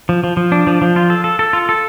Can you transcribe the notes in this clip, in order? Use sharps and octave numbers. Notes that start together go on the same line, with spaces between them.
F3
F3
F3
D4
F3
F3
F4
A4
A4
A4
F4
A4